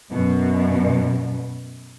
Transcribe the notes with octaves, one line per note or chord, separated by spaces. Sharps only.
F#2 B2